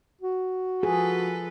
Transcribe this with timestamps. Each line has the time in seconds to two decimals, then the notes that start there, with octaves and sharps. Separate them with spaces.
0.21 F#4
0.83 F3 G#4 A4 B4